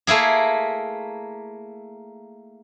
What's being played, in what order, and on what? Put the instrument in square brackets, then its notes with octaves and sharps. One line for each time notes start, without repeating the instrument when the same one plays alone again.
[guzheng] A3 A#3 E4 G#4